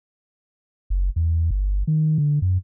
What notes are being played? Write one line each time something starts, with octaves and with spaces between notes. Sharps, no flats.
F#1
E2
G1
D#3
D3
F#2